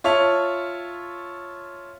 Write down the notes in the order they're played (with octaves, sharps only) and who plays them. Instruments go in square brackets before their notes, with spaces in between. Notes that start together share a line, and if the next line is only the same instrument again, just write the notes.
[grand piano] F4 C#5 E5 A5 F7